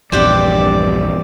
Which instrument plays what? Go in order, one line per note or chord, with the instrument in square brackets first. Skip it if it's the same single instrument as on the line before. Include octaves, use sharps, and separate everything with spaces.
[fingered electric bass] A#1 E2 [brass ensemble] G2 [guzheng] C4 G4 F#5 [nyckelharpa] D5